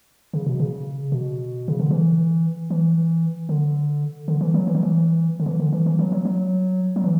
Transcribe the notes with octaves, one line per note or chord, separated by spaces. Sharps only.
C#3
B2
C#3
B2
C#3
D3
E3
E3
D3
D3
E3
F#3
E3
F#3
E3
D3
E3
D3
E3
E3
F#3
F#3
F#3
F#3
E3